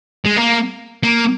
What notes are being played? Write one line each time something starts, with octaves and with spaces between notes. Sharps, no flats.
G#3
A#3
A#3